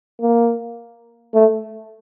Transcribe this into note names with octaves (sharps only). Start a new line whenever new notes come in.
A#3
A3